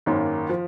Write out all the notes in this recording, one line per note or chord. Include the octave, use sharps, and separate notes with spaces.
G#1 F#2 D#3 A#3
F3